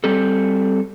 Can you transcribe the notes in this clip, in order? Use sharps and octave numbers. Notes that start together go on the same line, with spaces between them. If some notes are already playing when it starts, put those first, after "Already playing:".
G3 C4 A4